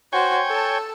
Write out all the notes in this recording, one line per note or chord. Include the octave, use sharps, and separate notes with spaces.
F#4 C5 C#5 G5 G#5
A4 A5